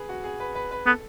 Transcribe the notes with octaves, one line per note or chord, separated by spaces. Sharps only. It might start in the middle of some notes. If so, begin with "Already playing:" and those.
Already playing: G#4 B4
F#4
G#4
B4
B4
B4
B3 A4